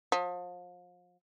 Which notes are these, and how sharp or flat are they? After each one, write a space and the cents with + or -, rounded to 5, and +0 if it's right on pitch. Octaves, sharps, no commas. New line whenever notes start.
F3 +35